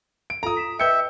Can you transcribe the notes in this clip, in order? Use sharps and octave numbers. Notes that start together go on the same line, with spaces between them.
D7
F4 A4 A#5 D#6
B6 E7
B4 D#5 E5 G5 G6 C#7